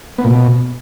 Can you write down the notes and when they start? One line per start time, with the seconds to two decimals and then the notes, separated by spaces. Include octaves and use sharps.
0.18 B3
0.24 A#2
0.30 B2